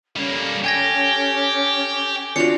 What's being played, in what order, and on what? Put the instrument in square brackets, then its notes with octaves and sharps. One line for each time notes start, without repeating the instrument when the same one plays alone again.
[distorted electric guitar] G3 A#3 [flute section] C#4 A4
[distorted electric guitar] G4 [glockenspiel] G#5 G#6 A#6
[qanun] D4 F4 F#4 [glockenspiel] C#7 F7